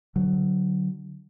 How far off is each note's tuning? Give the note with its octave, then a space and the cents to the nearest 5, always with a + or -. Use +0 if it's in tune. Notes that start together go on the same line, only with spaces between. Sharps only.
D3 +0 F#3 +5